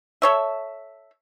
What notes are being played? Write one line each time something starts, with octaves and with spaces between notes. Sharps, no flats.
A4 C#5 E5